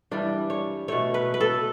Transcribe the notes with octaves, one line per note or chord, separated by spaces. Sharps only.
G2 E3 G3 D4
C#5
B2 A3 C#5
B4
B4
A4